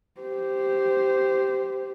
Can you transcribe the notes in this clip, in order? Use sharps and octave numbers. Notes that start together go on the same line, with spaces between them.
G4 C5